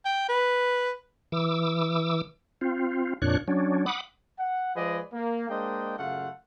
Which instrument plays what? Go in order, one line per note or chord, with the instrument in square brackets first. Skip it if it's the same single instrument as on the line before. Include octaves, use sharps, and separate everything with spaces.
[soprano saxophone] G5
B4
[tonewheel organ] E3 D6 E6
C4 F4
F2 A#2 D4 C#5 F#6
F#3 C#4 D4
F#5 B5 D6 D#6
[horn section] F#5
F3 G#3 G#4 B4 D5 D#5
A#3
G#3 A#3 D4 C5 D#5 G5
F#2 C#3 A3 F4 F5 F#5